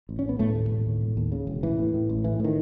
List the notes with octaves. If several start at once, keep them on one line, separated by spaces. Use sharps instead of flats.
A1
C#4
A1 B3
E1 A2 A3
D#2
E1
D#2
E1
D#2
C#3
E1
A1 E3
A2
A2
A1
A2 E3
A2 D#3